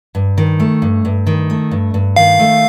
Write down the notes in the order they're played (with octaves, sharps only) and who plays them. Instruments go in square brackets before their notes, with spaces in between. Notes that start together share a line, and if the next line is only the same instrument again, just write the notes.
[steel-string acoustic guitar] G2
D#3
A3
G2
G2
D#3
A3
G2
G2
[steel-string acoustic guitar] D#3 [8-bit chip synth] F5
[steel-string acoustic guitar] A3